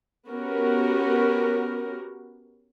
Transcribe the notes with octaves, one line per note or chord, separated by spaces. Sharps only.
B3 C#4 F#4 G4 A#4